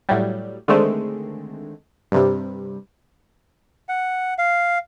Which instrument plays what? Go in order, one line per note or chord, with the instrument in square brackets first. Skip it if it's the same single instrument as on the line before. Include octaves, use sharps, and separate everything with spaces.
[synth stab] A2 F#3 G3
D3 D#3 G#3 A3 C4
G2 C3 G3
[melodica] F#5
F5